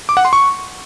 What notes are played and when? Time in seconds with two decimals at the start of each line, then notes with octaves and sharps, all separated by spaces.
0.09 D6
0.17 F#5
0.25 C6
0.33 C#6